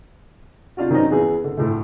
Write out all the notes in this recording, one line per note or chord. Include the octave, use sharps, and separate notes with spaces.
C3 D4 F4 F#4
D#3 F#3 C4 C#4 D#4
E2 E3 G#4
D3
D2 A2 D3